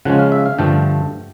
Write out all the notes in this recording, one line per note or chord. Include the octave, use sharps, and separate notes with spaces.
C#3 F3 G#3 C#4 F#5
F5
E5
F5
G2 D3 F3 A3 G5